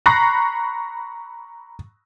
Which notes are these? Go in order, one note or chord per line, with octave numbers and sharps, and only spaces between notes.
A#5 B5 C#6 F#6 A#6 C7